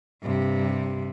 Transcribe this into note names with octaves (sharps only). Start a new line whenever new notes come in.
G2 C3